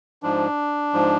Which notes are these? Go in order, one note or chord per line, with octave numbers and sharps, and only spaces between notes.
G#2 F3 D4
G#2 F3